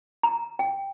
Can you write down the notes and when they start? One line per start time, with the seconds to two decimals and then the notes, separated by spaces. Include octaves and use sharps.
0.23 A#5
0.59 G5